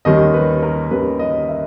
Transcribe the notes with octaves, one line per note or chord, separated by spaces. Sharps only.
D#2 D#3 G3 C#4 D#5
B4
A#4
D#2 D#3 G3 C#4 B4
D#5
E5